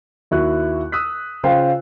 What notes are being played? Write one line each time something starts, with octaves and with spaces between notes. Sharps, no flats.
D#2 E4 F#4 F#6
D#6 E6 F#6 B6
C#3 F4 C5 F5 G5